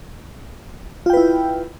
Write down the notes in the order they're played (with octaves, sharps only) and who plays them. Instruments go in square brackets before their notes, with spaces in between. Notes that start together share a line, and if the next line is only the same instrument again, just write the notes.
[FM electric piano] F4
G5
B4
E4